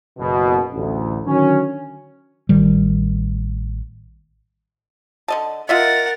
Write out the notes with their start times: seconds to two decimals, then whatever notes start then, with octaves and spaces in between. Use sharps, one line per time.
0.19 F#1 B2
0.73 A1 D2
1.26 D3 D#3 F#3 C#4
2.49 A1 D#3 G3
5.28 D3 D#5 A5
5.69 F4 A#4 D#5 E5 F#5 A6